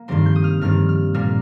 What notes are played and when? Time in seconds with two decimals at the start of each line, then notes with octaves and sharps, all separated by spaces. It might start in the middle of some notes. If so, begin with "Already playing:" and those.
Already playing: A#3
0.08 G2 D#3 G3 C4 C6
0.26 G6
0.36 D#6
0.44 F6
0.61 G2 D#3 G3 C4 F6
0.89 F6
1.14 A#2 G3 A#3 F6